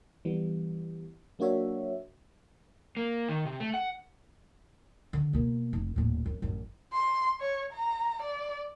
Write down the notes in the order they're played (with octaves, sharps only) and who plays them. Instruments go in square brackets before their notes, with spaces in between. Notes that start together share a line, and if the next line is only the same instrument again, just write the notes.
[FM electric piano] E3 G3 B3
F#3 A#3 D4 F#4 C#5 E5
[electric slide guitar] A#3
D#3
C3
A3
F#5
[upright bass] D3
B2 A#3
F1
D#1 A2
F#2
A1 F#2
[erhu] C6
C#5
A#5
D5